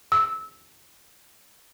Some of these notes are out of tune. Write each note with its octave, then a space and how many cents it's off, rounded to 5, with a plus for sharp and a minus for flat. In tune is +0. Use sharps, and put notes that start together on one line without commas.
E6 -20